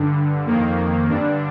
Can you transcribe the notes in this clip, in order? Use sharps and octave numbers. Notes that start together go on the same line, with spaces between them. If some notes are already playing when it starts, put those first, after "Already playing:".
Already playing: G2 D3
F2 D#3 A#3
G2 D3 D4